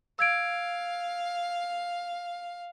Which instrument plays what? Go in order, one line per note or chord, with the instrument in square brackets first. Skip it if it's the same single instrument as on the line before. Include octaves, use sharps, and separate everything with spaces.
[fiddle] F5 [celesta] E6 G#6 D7